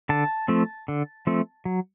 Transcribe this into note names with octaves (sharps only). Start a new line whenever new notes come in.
D3 A5
F3 A3 C4
D3
F3 A3 C4
F#3